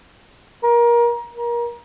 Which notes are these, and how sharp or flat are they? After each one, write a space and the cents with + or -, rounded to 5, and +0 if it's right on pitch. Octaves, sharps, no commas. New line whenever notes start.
A#4 +25
A#4 +25